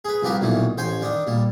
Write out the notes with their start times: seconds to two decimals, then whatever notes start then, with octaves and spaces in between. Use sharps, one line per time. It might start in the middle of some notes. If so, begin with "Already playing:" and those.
0.05 G#4 B4
0.23 C2 F3 G4 A#4 B4
0.41 B1 A#2 D#3 E3
0.78 A1 C5 G5 G#5
1.01 D#3 D4 D#4
1.27 A#2 G3